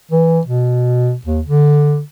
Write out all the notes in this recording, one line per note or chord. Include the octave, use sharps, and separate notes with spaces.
E3
B2
D#2
D3